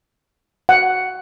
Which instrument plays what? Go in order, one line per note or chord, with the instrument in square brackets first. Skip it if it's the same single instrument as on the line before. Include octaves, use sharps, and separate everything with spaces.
[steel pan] F#5